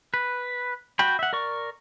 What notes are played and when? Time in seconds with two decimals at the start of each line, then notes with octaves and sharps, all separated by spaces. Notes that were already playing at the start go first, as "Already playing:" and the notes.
0.14 B4
0.99 F#4 G5 B5
1.19 E5 F#5
1.33 A#4 D5 C#6